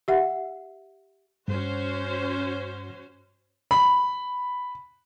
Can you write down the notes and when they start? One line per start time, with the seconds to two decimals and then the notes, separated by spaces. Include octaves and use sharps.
0.08 G4 E5 F#5
1.48 G2 C#4 F#4 C5
3.71 B5